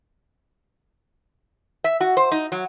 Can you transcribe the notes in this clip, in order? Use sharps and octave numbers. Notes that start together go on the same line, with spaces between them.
E5
F#4
C5
D#4
F#3